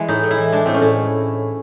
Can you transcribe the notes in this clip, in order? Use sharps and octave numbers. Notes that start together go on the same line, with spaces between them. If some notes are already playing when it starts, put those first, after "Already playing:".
Already playing: E3 G#3
A2 D#4
A2
E4
E3
G#3 D4
A2 C4
C#4
A2